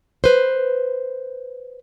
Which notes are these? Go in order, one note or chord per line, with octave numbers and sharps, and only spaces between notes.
B4 C5